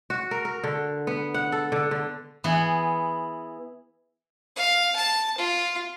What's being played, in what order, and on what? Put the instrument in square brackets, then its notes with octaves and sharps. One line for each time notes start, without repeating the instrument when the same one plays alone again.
[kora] F#4
A#4
A#4
D3
B3
F#5
A4
D3
D3
[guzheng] E3 B3 G#4
[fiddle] F5
A5
F4